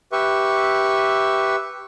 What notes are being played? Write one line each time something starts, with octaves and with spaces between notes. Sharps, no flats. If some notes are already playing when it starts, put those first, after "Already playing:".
G4 B4 E5 C#6